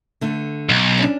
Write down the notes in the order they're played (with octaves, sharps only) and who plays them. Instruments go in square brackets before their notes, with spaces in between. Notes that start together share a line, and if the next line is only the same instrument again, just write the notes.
[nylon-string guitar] D3 A3
[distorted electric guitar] B1
[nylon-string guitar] C#4 D4